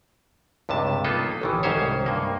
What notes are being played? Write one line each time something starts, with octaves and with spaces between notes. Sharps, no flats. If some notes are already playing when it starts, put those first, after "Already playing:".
C#2 G2 C3 A5
A#3 B3 D#4 F4 A4
A1 D#3 E3
C2 G#2 D#3 C#4 C5 C#5
G2 A#3